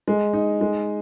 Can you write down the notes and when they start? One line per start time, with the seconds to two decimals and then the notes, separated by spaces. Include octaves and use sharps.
0.08 G#3
0.33 D#4
0.61 G#3